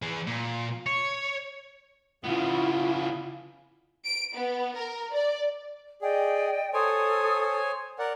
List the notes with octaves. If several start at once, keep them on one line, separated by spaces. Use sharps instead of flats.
E3 G#4
A#2
C#5
C#3 B3 E4 F4
D7
B3
A#4
D5
G#4 D5 D#5 G5
A4 C5 C#5 G#5 D#6
A#4 D5 F#5